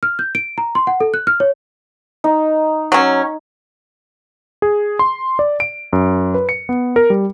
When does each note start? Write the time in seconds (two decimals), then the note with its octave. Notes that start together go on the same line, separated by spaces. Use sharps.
0.03 F6
0.19 G6
0.35 D7
0.58 A#5
0.75 C6
0.87 F#5
1.00 A4
1.14 F#6
1.27 F6
1.40 C#5
2.24 D#4
2.92 F#3 C#4
4.62 G#4
4.99 C6
5.39 D5
5.60 D7
5.93 F#2
6.34 B4
6.49 C#7
6.69 B3
6.96 A#4
7.10 G3